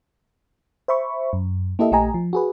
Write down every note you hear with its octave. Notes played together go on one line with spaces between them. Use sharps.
C5 E5 B5 C#6
F#2
A#3 E4 G4 A4 D#5 E5
A#1 A3 G4 D#5 G#5 A#5
F3
F#4 G#4 B4